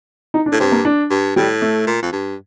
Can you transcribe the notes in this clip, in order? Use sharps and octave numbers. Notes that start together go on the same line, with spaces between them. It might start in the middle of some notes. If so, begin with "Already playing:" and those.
D#4
D4
A2
G2 C4
A#3
D4
G2
A2 G3
A3
A#2
F2
G2